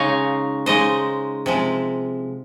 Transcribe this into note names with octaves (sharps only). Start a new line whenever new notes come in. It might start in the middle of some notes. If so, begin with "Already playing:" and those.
Already playing: C#3 G#3 D#4 C#5 F5
C#3 G#3 D#4 C5 D#5
C3 F3 G#3